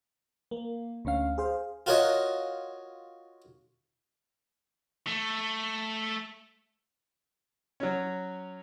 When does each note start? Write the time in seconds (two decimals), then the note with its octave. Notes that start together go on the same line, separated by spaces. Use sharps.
0.51 A#3
1.05 D2 D3 C#4 F5
1.38 G#4 C5 F5
1.86 F4 F#4 A#4 C#5 D#5 F#5
5.07 A3
7.80 F#3 C#4